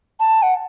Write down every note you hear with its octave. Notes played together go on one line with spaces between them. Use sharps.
A5
F#5